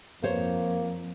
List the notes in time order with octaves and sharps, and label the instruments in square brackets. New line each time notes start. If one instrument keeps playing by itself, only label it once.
[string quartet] F2 [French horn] A#3 [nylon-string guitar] C5 C#5